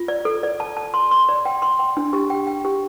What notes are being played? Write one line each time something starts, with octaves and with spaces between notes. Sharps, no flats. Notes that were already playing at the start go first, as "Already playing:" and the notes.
Already playing: F4
D5
A4
D5
A5
A5
C6
C6
D5
G5
C6
G5
D4
G4
G5
G5
G4